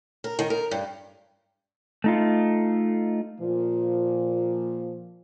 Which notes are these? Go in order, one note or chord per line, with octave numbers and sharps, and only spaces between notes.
A#4
D#3
A#4
G2
A3 D#4 F4
A#2 F3